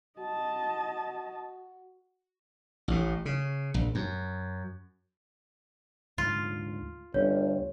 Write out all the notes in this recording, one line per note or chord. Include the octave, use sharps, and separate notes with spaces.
F#4 D#5 A5
A1 A2
C#3
A#1
F#2
D2 G#2 F4
G1 D2 C#4 C#5